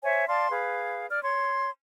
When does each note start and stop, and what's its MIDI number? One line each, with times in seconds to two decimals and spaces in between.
0.03 0.28 72
0.03 0.28 73
0.03 0.28 76
0.03 0.28 80
0.28 0.50 74
0.28 0.50 77
0.28 0.50 81
0.28 0.50 84
0.51 1.05 68
0.51 1.05 71
0.51 1.05 77
1.10 1.22 74
1.10 1.22 89
1.24 1.71 73
1.24 1.71 84